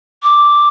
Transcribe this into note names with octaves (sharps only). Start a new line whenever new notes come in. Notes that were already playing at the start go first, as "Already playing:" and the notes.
D6